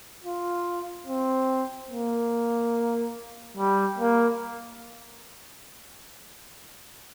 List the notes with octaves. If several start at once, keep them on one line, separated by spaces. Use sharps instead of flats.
F4
C4
A#3
G3
A#3